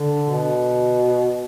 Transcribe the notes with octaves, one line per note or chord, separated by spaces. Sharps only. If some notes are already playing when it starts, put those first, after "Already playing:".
Already playing: D3
B2